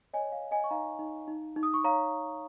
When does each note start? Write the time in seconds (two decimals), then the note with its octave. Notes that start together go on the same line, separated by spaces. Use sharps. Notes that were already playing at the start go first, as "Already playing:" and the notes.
0.13 C#5 D#5 G#5
0.32 F5
0.43 C#5
0.51 D#5 G#5
0.64 C#6
0.70 D#4 F5 A#5
0.99 D#4
1.28 D#4
1.56 D#4
1.63 D#6
1.74 C#6
1.84 C#5 F5 A#5